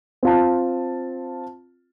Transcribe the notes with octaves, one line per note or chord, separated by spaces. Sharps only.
C4 F4 A5